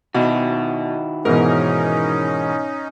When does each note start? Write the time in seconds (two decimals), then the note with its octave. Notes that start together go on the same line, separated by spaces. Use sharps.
0.15 B2 D#3 E4 F#4
1.25 G#2 B2 E3 C#4 D#4 A#4